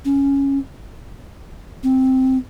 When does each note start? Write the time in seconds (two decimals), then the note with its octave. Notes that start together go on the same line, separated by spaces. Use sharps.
0.05 C#4
1.84 C4